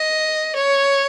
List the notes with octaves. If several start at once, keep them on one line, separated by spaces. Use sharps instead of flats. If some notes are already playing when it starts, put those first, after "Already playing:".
Already playing: D#5
C#5